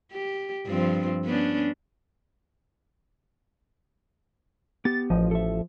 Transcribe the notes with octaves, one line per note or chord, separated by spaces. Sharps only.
G4
G2 F3 C4
B3 C#4 D4
B3 G4 A6
A1 F3 D#5
A4 E5